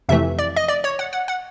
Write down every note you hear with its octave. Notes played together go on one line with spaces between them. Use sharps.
F2 C3 E3 A3 E5
D5
D#5
D5
C#5
F#5
F#5
F#5